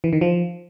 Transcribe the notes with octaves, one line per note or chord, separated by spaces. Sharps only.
E3
D#3
F3